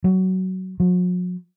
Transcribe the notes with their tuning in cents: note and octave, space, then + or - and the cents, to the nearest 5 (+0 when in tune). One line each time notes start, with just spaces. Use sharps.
F#3 +15
F#3 -45